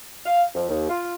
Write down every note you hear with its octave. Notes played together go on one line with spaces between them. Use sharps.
F5
F2
D#2
F4